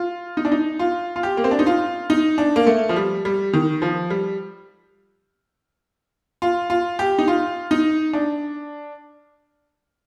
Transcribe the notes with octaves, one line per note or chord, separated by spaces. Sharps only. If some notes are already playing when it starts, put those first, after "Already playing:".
Already playing: F4
D#4
D4
D#4
F4
F4
G4
A#3
C4
D4
D#4
F4
D#4
D4
A#3
A3
F3
G3
G3
D#3
F3
G3
F4
F4
G4
D#4
F4
D#4
D4